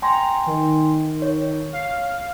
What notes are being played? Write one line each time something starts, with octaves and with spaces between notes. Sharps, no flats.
G5 G#5 A#5 C6
D#3
C#5
F5